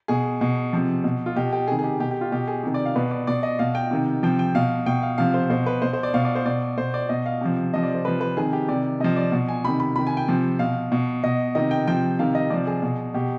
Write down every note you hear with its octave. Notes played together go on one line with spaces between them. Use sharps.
B2 G#4
B2
C3 F3
B2
F4
B2 G4
G4
C3 D#3 G#4
G#4
G4
B2 G4
G4
F4
B2 G4
G#4
C3 D#3
D5
F5
B2 B4
D5
B2 D5
D#5
B2 F5
G5
C3 D#3
C3 F3 G5
G5
B2 F5
B2 G5
F5
C3 F3 F5
C5
B2 C5
B4
B2 C5
C5
D5
B2 F5
D5
C5
B2 D5
B2 C5
D5
B2 D#5
F5
C3 F3
C3 F3 D#5
D5
C5
C3 F3 B4
B4
C3 D#3 G#4
G4
C3 D#3 D5
C3 F3 D#5
D5
B2
G#5
C3 D#3 B5
B5
C3 D#3 B5
G#5
G5
C3 F3
B2 F5
B2
B2 D#5
C3 D#3 D#5
G5
C3 F3 G5
C3 D#3 F5
D#5
C3 F3 D5
G#4
B2
B2 G4